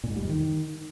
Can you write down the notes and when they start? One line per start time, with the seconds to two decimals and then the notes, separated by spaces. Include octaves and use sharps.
0.04 A#2
0.10 G#2
0.16 G3
0.23 F2
0.29 D#3